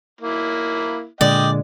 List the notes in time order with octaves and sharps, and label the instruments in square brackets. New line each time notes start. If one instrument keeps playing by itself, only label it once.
[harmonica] A#3 E4
[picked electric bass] A#2 D3 G#3 [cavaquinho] D5 [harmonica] D#5 G5